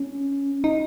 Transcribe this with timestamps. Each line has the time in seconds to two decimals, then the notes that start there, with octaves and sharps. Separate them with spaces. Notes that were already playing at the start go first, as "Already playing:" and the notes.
Already playing: C#4
0.64 D#4